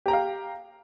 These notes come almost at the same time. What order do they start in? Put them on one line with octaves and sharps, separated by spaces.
G4 A#5 G5 F5